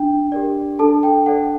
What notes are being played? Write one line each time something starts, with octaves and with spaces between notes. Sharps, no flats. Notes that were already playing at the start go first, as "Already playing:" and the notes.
Already playing: D4 G5
G4 A#4 D5
D4 A4 A5
G5
A4 D5 F#5